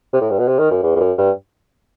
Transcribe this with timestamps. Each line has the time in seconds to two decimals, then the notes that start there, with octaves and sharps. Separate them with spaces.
0.13 C3
0.21 A2
0.30 G2
0.39 B2
0.48 C3
0.59 D#3
0.71 F#2
0.83 E2
0.95 E2
1.00 F#2
1.18 G2